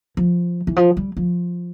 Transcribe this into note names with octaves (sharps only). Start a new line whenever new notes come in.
F3
E3
F3
G3
F3